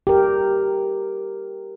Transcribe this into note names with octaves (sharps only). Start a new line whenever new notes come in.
G4 A#4